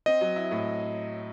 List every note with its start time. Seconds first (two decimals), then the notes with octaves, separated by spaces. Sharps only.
0.06 C4 D#5
0.21 F#3
0.36 E4
0.51 A2